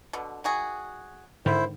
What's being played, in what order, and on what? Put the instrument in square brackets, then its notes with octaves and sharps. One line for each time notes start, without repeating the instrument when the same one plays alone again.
[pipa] B2 D3
D#3 F#4 G#4
[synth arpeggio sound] G#2 D3 D#3 [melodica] E4 C5